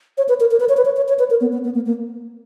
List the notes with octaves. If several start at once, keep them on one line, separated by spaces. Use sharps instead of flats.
C#5
B4
A#4
A#4
B4
C#5
B4
C#5
C#5
C#5
B4
A#4
B3
B3
B3
A#3
A#3